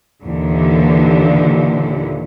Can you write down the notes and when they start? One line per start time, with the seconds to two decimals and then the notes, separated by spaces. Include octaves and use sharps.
0.24 D#2 A#2 D3 E3